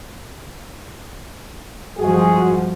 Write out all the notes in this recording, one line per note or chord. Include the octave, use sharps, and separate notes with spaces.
G1 F3 G#3 F#4 G#4